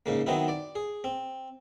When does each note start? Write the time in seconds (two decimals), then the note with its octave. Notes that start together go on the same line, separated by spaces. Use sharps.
0.06 G#2 C#3 A#3
0.26 D#3 F#3 B3 C4 D#4 E4
0.48 D5
0.75 G#4
1.04 C4